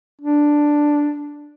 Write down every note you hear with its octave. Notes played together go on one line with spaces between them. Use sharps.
D4